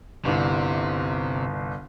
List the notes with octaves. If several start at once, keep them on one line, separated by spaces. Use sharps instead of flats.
G1 C2 C3